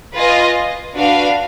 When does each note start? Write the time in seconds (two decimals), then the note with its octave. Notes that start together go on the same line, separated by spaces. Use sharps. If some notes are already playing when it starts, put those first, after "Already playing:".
0.15 F4 B4 D#5 G#5
0.96 D4 F#4 B4 F5